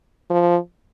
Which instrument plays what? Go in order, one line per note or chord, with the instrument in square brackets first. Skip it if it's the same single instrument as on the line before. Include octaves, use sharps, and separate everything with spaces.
[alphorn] F3